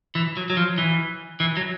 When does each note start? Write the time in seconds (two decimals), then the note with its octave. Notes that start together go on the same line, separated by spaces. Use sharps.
0.15 E3
0.37 F#3
0.50 F#3
0.57 F3
0.78 E3
1.40 E3
1.57 F#3